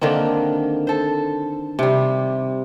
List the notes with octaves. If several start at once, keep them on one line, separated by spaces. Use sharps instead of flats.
D3 D#3 A#3 C4
A4 C5
C3 G3